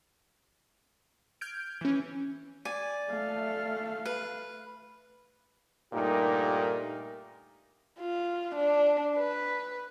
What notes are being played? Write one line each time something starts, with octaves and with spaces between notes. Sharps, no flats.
F6 G6 G#6 D7
E3 C#4
D5 G#5
A3 F5
B4
G2 A#2 A3 D#4 G4 A#4
F4
D4
B4